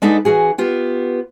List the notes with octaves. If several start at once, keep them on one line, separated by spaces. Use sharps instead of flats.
G#3 D4 D#4 A4 B4 F#5
E3 C#4 F#4 G#4
B3 F4 G4